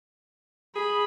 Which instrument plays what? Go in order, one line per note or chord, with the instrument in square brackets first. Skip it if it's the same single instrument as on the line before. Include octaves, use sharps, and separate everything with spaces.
[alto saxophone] G#4 [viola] B5